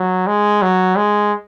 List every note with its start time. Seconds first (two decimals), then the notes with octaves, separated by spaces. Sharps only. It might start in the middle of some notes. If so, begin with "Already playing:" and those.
Already playing: F#3
0.27 G#3
0.62 F#3
0.96 G#3